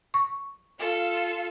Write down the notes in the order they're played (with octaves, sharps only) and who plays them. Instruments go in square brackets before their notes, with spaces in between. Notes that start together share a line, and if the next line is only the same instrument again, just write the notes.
[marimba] C#6
[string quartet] F4 A4 F5